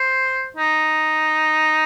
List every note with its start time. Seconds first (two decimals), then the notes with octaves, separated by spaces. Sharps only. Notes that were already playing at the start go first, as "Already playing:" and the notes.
Already playing: C5
0.57 D#4